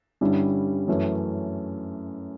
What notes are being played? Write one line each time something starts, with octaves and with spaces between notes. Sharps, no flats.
G2 D3 G3 C#4 E4
F#2 E3 A3 C#4